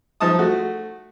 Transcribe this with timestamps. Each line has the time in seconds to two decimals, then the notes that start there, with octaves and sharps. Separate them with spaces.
0.20 F3 D#4 A5 D#6
0.39 A3 F#4